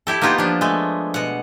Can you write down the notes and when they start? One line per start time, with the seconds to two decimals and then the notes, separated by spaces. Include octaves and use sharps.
0.07 E4 G4 A4
0.22 A#3 B3 D#4 F4 G4
0.38 F3 D4
0.61 G#3 A3
1.14 B2 F#5